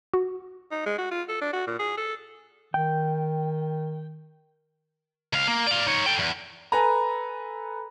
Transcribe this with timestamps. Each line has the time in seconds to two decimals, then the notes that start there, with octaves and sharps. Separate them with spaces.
0.14 F#4
0.71 D#4
0.86 G#3
0.98 F#4
1.11 F4
1.29 A4
1.41 D4
1.53 F#4
1.67 A#2
1.79 G#4
1.98 A4
2.74 D#3 G5
5.33 C#2 F5
5.48 A#3
5.66 D5 F5
5.87 D#4 C#5
6.06 A4 G5
6.19 E2
6.72 A4 B4 G#5 A#5